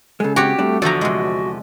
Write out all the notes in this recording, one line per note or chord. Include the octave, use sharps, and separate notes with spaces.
C#3 G#3 A4
C4 F#4 G4 C#5
G3 A3 C4 D4
E2 D3 F3 F#4 A4 D5 A#5
C3 G#3